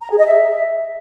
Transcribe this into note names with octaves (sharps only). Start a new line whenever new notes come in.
A#5
G#4
D#5
E5